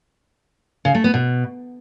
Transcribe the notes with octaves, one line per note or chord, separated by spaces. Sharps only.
C#3
A3
B3
B2